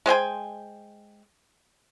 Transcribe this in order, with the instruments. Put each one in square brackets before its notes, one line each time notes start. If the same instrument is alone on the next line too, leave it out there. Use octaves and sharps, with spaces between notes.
[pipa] G#3 C5 G5 G#5